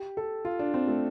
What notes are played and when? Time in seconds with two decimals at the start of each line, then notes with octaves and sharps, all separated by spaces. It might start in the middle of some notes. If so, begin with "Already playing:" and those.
Already playing: G4
0.17 A4
0.45 F4
0.59 D4
0.74 C4
0.87 A3